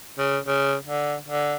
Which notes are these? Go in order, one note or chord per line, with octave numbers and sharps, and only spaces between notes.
C#3
C#3
D3
D3